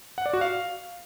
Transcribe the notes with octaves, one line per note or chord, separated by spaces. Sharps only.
F#5
D5
F#4
F5